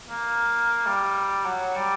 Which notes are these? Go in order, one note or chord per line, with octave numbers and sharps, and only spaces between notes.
A#3
G3
F#3
G3